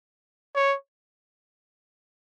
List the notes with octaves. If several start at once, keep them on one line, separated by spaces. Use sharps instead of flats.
C#5